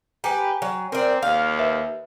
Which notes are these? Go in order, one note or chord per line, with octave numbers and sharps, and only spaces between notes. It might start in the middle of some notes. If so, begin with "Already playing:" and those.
G4 B4 G5 G#5 A#5
F#3
C4 A#4 D5
D#2 F5
B4 E5